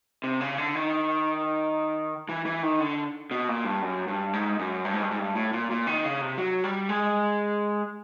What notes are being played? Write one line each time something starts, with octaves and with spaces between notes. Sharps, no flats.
C3
C#3
D3
D#3
E3
E3
D#3
D3
B2
A#2
G2
F#2
G2
G#2
F#2
G2
G#2
G2
G#2
G2
A2
A#2
A#2
D#3
C#3
C3
F#3
G3
G#3